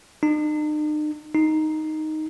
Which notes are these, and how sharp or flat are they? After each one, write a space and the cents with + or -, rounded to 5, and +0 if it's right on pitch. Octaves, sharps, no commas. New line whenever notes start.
D#4 -45
D#4 +0